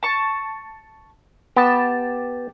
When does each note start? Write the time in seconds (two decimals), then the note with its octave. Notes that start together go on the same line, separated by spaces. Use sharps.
0.03 A5 C#6
1.56 B3 G4 A5